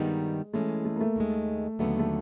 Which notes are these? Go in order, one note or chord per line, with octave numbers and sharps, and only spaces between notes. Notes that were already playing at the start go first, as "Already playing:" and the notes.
Already playing: G2 D#3 G3 G#3 B3 D#4
E3 G#3 A3 C#4
A3
A#3
A3
D#2 D#3 G#3
D#2 D3 F#3 A3 B3
A3